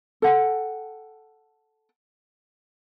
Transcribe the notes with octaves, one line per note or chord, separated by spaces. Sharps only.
A4 F#5 G5